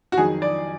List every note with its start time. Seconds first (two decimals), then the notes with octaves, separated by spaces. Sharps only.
0.12 F#4
0.17 F2 D#3 F#3 G#4
0.42 D5